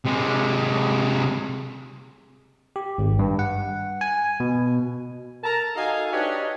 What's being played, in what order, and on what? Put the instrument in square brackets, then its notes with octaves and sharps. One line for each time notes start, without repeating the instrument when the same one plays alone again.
[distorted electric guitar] C3 G#3
[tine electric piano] G4
G#1
G2
F#5
G#5
B2
[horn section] A#4 A5 A#5
D#4 F#4 A4 D#5 F5 G#5
D4 D#4 G4 B4 C#5 D#5